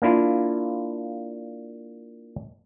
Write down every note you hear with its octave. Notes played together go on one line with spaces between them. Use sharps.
A#3 D4 E4 F4